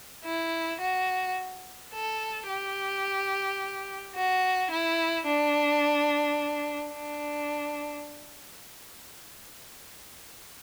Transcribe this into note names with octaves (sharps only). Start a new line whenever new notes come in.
E4
F#4
A4
G4
F#4
E4
D4
D4